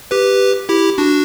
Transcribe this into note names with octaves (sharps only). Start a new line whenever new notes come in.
G4 B4
E4 G4
D4 F#4